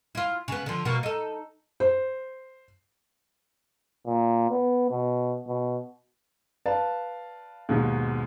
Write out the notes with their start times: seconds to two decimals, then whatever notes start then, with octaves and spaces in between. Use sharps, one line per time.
0.15 E4 F4
0.48 C#3 B3
0.66 D3 F3
0.85 B2 A#3 F#4
1.03 D#4 A4
1.80 C5
4.06 A#2
4.50 B3
4.91 B2
5.47 B2
6.66 B4 D5 F5 A5
7.69 D#2 G#2 B2